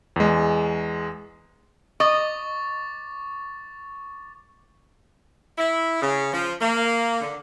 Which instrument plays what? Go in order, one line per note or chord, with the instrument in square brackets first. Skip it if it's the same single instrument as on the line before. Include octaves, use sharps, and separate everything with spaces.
[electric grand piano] E2 G#3
[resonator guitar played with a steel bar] D#5 [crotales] C#6 D6 A6
[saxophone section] E4
C#3
F3
A#3
D3